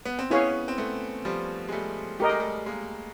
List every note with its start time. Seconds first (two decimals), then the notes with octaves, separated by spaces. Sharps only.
0.05 B3
0.19 C4
0.30 B3 C#4 E4 G#4 C#5 F5
0.68 C4
0.78 A3 B3
1.25 F3 G3
1.69 G#3
1.72 G3 A3
2.19 A3 G4 A#4 D#5
2.29 G#3
2.39 G3 A3
2.66 G#3 A#3